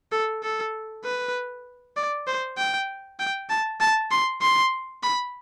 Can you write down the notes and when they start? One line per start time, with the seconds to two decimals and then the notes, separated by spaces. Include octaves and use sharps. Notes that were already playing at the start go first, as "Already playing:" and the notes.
0.12 A4
0.43 A4
1.04 B4
1.97 D5
2.27 C5
2.58 G5
3.20 G5
3.50 A5
3.80 A5
4.11 C6
4.42 C6
5.03 B5